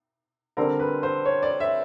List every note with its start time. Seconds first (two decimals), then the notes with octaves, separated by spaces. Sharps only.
0.57 D3 G3 C4 A#4
0.80 B4
1.03 C5
1.25 C#5
1.43 D5
1.60 E5